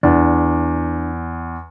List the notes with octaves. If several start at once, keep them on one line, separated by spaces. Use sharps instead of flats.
E2 D4